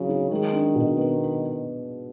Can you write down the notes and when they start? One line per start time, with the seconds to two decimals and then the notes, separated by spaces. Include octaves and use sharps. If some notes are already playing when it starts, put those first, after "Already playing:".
Already playing: C#3 F#3 F#4
0.09 D#4
0.31 D#3 G#3
0.53 D4
0.75 B2
0.97 B3